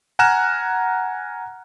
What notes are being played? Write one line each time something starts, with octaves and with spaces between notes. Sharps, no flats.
F#5 G#5 A#5 F6 F#6 E7